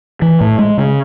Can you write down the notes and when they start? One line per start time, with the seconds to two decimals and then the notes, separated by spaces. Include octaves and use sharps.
0.22 E3
0.41 A2
0.59 G#3
0.78 C#3